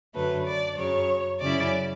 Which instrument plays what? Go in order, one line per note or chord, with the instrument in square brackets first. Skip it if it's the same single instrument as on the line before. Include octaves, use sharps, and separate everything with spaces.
[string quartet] F#2 D3 F#3 A3 B4
D5
F#2 C#3 F#3 C#5
F#2 C#3 F#3 C#4 E4 D5